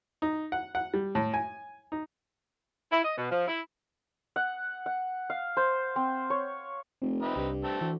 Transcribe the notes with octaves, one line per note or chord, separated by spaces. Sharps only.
D#4
F#5
F#5
G3
A2
G#5
D#4
E4
D#5
B2
F3
E4
F#5
F#5
F5
C5
C4
C#5
F1 A3 C4
C4 D#4 B4 E5 B5
C2 G2 C3
A3 C4 A4
D2 E3